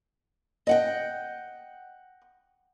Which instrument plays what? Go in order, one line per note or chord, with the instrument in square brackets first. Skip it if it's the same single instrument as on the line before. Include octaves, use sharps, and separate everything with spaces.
[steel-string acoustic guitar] D#5 F#5 G5